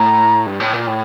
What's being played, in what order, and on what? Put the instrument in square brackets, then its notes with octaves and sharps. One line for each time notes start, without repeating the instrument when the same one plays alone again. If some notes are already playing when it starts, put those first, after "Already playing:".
Already playing: [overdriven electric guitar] A2 [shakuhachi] A#5
[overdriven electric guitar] G2
A2
A#2
A2